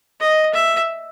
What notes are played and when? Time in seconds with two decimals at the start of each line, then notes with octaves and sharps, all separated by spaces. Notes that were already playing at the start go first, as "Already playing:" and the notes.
0.20 D#5
0.54 E5